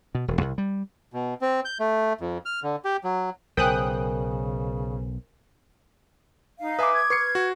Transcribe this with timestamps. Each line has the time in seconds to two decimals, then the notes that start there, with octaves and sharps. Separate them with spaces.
0.15 B2
0.28 E1
0.41 C2
0.58 G3
1.13 B2
1.41 C4
1.65 G6
1.80 A3
2.21 F2
2.45 F6
2.63 D3
2.85 G4
3.04 F#3
3.57 B1 C#3 A#4 C5 G5 G#5 D#6 F#6
6.59 D#4 F5
6.79 B4 E5 G#5 D6 D#6
6.92 G#6
7.10 B4 C#6 C7 C#7
7.35 F#4